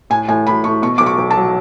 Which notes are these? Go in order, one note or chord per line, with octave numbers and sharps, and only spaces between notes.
A2 G#5
A2 G#5
A2 B5
A2 C#6
B2 C#6
B1 D6
C#6
B1
A5
F#3